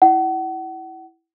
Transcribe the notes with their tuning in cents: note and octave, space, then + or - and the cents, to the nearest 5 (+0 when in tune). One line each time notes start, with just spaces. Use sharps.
E4 +0 F#5 +35